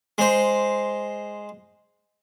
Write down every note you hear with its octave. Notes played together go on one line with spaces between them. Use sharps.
G#3 C5